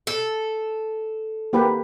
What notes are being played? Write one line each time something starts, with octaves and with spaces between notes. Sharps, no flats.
A4
A#3 G4 B4